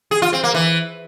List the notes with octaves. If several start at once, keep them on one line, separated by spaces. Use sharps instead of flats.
G#4
F4
C4
A#3
E3